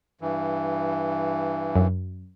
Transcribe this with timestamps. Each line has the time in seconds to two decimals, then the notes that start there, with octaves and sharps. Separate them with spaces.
0.21 G2 E3
1.76 F#2